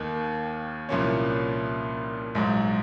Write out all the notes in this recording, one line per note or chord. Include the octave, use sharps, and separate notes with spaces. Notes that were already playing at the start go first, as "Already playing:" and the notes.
Already playing: D#2 D#3 A#3
C2 A#2 F3 A#3 C#4
A#1 G#2 F#3